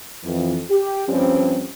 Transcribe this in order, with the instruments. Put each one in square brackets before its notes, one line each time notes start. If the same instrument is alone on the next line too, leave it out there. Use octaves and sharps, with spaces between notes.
[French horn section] F2 E3
G4
G2 F3 G3 C4 C#4